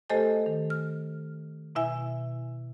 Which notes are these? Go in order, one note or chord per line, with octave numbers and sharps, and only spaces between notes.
A3 G4 A4 C5 D#5 G#5
D#3
F6
B2 E4 E5 G#5